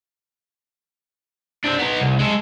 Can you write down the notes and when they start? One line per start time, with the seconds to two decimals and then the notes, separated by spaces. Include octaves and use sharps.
1.64 C4 D4
1.79 B3 D#4
2.00 C2
2.19 G#3 A4